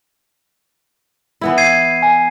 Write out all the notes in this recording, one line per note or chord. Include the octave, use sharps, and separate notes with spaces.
E3 B3 E4
G#6 C7 D#7
G#5